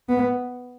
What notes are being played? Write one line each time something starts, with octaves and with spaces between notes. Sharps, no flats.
B3